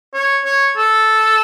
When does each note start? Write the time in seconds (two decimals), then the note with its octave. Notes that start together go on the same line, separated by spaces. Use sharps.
0.14 C#5
0.45 C#5
0.76 A4